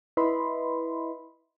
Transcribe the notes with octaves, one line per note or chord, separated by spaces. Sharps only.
E4 B4 D#5 E5 B5 C6